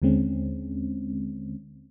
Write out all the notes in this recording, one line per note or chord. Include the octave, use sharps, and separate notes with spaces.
D#2 D3 G#3 C4 C#4